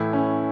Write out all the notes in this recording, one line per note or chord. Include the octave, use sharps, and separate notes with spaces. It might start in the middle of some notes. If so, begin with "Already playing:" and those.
Already playing: A2 E3 A3 E4
C#4